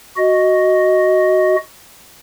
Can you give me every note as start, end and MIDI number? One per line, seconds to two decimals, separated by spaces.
0.17 1.56 66
0.17 1.56 75